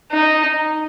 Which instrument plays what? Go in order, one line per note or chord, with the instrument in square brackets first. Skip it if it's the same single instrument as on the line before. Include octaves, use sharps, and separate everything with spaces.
[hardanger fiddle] D#4